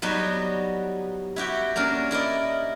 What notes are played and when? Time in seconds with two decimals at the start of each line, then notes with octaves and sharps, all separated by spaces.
0.02 F#3 G3 B3 D#4 F#4
1.36 E4 F#4 G4 G5
1.76 A#3 C#4 D4 A#4
2.11 E4 A#4 D5 D#5